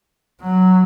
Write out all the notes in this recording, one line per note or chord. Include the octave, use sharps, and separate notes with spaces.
F#3